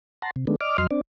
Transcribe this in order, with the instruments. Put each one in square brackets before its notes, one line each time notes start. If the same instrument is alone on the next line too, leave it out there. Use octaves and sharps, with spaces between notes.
[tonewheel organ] F#5 A5 A#5 C6
C3
D#3 G#3 A3 B3 D4
D5 D#5 D6 F6
F2 F#3 D#5 C6 F6
C4 D4 D5